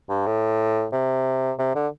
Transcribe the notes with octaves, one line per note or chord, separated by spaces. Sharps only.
G2
A2
C3
C3
D3